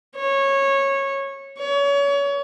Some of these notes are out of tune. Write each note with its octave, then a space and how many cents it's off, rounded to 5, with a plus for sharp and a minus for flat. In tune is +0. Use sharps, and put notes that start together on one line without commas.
C#5 -15
C#5 +30